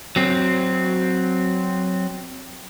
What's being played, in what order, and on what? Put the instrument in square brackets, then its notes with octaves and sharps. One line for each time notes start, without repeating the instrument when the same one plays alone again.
[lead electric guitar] F#3 C4